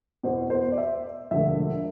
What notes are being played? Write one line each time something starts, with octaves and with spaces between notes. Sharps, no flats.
E2 B2 C5
C5
D5
E5
E1 D2 D3 F3 E5